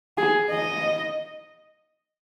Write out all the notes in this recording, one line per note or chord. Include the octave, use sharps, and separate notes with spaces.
G#4
D#5